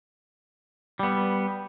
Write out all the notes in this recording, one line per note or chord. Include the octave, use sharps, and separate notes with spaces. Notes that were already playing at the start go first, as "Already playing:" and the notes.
G3 B3